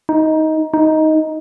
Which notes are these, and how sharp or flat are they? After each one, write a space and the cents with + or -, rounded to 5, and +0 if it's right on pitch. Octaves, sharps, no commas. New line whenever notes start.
D#4 +15
D#4 +10